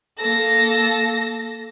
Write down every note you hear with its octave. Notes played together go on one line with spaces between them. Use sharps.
A#3 A4 A#6